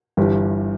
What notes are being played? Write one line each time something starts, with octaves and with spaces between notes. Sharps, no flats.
G1 G2 E3 G4